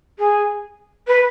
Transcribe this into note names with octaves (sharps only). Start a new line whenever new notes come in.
G#4
B4